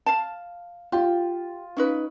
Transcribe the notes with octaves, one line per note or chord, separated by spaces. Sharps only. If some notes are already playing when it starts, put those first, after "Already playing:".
F5 A5
F4 G4
C#4 D#4 B4